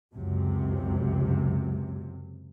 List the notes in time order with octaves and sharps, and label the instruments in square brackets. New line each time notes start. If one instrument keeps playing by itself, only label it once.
[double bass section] C#2 F#2 C3